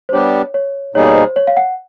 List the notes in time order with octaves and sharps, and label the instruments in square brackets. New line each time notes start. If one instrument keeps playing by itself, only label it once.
[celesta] C5
[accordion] G3 B3 D4 G4 [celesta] C#5
[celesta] C#5
[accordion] B2 G3 A#3 D#4 G#4 [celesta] C#5
[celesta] C#5
C5
C#5
F5
F#5